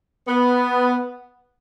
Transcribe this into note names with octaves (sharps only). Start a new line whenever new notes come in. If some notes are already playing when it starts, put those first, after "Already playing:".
B3